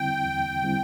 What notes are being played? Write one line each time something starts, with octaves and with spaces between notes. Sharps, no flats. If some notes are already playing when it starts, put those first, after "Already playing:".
Already playing: E2 D3 G3 C4 E4 G5
E2
D3 G3 C4 E4